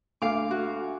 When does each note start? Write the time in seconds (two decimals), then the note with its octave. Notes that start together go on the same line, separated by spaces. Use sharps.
0.22 D2 A3 F5 D6
0.51 F#4